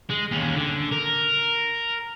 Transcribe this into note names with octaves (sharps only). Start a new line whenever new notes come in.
G#3
D#2 C#4
D3
A#4